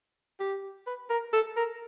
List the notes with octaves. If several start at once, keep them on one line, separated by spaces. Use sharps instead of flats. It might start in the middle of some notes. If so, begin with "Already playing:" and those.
G4
B4
A#4
A4
A#4